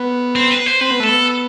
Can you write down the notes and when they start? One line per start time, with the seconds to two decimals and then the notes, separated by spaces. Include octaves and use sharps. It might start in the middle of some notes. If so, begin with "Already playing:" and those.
Already playing: B3
0.36 C4
0.51 B4
0.66 C5
0.81 C4 B4
0.91 B3
1.00 A3 A4
1.09 B3